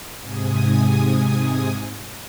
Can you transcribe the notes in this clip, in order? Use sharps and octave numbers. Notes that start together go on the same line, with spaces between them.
G#2 C3 G#5 D#6